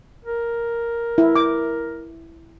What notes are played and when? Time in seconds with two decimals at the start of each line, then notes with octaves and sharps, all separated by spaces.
0.25 A#4
1.18 E4
1.36 D6